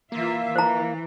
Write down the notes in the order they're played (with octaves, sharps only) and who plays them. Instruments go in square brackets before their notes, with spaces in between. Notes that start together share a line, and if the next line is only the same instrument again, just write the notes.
[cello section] E3 F4 E5 [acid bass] A#3
[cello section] E3 [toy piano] C5 A#5